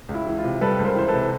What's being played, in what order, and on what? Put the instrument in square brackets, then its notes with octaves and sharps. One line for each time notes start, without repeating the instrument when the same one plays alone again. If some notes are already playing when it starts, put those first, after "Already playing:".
[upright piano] C#2
E4
E3
F4
C3
G3 A4 B4
C#2
A#4 C5
E3 C5
A4 B4
C3